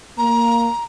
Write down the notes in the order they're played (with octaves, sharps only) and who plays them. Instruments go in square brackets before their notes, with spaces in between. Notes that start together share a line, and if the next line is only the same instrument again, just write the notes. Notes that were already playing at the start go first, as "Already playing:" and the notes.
[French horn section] A#3 [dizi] A#5